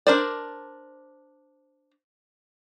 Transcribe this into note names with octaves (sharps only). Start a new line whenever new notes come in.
D4 A#4 C5 D5